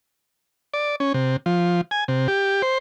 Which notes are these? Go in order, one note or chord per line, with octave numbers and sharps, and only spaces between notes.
D5
C#4
C3
F3
G#5
C3
G4
C5